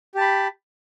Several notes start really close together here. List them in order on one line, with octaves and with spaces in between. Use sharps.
G4 A5 B5